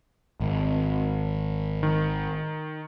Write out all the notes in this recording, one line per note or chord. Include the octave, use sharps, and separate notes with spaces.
G#1
D#3